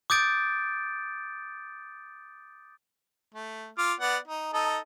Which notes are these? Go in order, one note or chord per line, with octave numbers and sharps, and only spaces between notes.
D6 D#6 G6 A6 D7
A3
F4 D6 F6
B3 D5 F#5
D#4
D#4 A4 D#5